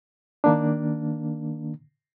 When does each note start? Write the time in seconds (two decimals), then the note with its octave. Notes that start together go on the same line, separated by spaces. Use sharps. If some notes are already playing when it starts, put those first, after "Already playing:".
0.44 D#3 A#3 D4